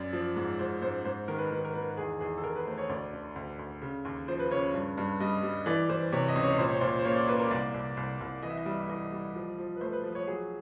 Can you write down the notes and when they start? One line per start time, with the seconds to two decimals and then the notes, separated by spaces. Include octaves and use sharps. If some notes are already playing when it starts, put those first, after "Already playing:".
Already playing: F#2 D5
0.13 F3
0.36 G#2
0.59 G#2 C5
0.82 G#2 C5
1.05 G#2 C5
1.28 D#3 A#4
1.38 B4
1.46 A#4
1.52 D#3 B4
1.65 A#4
1.74 D#3 B4
1.82 A#4
1.97 E2 G#4
2.20 E2 G#4
2.38 A4
2.43 E2 A#4
2.55 B4
2.67 A3 C5
2.78 C#5
2.89 D2 D5
3.13 D3
3.36 D2
3.59 D2
3.82 C#3
4.05 D#2
4.28 F3 C5
4.39 B4
4.51 C#3 C#5
4.74 G2
4.97 G2
5.20 G3 D#5
5.43 G3
5.66 E3 D5
5.89 E3 C5
6.12 C3 C#5
6.28 D#5
6.36 C#2
6.43 C#5
6.58 A#2 C5
6.69 C#5
6.80 A#2 C5
6.99 C5
7.05 A#3 C#5
7.16 D5
7.27 A#3 B4
7.39 A#4
7.51 C2 D5
7.74 C2
7.97 C2
8.20 C2
8.43 E3 D#5
8.50 E5
8.58 D#5
8.66 G3 E5
8.82 E5
8.89 E3 D#5
9.12 G3
9.35 F3
9.58 F3
9.76 B4
9.81 A3 C5
9.93 B4
10.04 F3
10.15 C#5
10.27 F#3 G#4